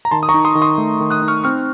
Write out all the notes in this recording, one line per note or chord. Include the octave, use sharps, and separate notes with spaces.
A#5
D#3 A5 C6
D#6
A#5 C#6
D#4
C6 D#6
D#3
C6 D#6
A3
D#3
D#6 F#6
D#4
C#6 F6
C4 C#6 F6